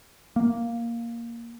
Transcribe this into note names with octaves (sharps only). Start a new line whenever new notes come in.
A#3